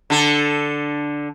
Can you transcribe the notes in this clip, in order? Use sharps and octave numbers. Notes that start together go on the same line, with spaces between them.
D3 A4